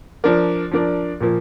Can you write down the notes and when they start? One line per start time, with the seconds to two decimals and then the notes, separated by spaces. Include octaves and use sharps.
0.24 F3 D4 A#4 D5
0.71 F3 D4 A#4 D5
1.21 A#2 F3 A#3